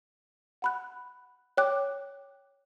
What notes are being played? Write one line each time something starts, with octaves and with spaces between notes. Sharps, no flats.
F#5 B5 F#6
C#5 G5 D6 F#6